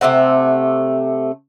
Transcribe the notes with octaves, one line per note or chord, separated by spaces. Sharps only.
C3 A3 C4 F#5